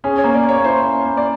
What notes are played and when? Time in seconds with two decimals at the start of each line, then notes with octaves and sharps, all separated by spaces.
0.04 C#4 G#4
0.18 C#5
0.24 A#3
0.35 D5
0.44 A#3
0.49 C#5
0.64 E4 C5
0.85 C#4
1.05 A#3
1.17 D5